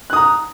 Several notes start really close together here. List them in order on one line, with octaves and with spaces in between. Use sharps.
F#6 D#6 A#5